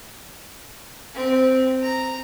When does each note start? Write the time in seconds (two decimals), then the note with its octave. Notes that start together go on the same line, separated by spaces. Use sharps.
1.14 C4
1.83 A#5